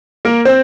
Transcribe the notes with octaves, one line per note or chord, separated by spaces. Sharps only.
A#3 A#4
C4 C5